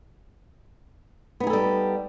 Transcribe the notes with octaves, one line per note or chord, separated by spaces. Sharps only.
G3 B3 D#4 G#4 A4